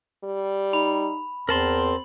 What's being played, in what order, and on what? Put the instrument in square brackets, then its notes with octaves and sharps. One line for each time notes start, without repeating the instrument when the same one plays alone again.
[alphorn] G3
[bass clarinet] D#4 [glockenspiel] B5
[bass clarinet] E2 [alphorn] C4 [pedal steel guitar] A#4 A5 C6 [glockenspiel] F#7